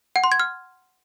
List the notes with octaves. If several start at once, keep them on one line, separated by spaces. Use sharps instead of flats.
F#5
C6
G#6
F6